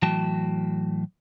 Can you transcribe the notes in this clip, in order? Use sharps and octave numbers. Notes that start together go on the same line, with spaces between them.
A2 E3 F#3 F#4 G5 A5